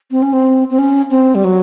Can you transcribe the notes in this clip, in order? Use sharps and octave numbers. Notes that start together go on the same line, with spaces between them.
C4
C#4
C4
C4
C#4
C4
G3
F#3